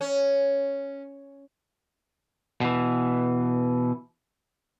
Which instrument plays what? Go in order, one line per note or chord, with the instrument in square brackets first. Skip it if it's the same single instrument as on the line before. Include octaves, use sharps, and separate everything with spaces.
[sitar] C#4
[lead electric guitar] B2 E3